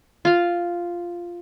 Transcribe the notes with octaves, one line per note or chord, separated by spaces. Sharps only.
F4 F5